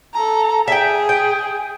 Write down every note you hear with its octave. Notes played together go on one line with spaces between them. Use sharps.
A4 A#5
G#4 E5 G5
G5